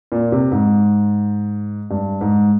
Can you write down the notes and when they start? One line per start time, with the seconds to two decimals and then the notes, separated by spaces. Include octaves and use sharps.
0.12 A#2
0.32 C3
0.52 G#2
1.91 G2
2.21 G#2